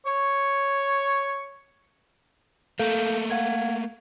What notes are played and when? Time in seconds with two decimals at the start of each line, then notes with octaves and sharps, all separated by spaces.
0.07 C#5 C#6
2.79 A3 A#3 A4 F5 G6
3.30 F5 F#5 G#6